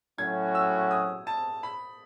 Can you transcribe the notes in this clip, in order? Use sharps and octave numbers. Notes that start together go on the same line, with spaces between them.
A2 F#3 C#4 F#4 G#6
E6
D#6
A5
B5